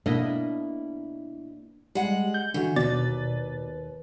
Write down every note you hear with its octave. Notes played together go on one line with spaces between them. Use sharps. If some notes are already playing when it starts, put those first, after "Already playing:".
B2 A#3 D4 E4 D#5
G3 G#3 F#5
G6
D3 E3 F#4
D#2 B2 B4 D5 A6